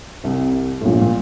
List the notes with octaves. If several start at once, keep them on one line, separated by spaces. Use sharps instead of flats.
C2 C3
A2
A#1 A#2
A#2